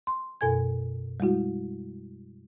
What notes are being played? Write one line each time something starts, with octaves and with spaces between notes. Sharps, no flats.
C6
F#2 B2 A4 G#5 G#6
G3 G#3 E4 F#4